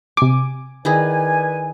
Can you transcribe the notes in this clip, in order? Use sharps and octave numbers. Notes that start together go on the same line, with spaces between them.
C3 G#5 D6
D#3 E4 G#4 B4 D5 G#5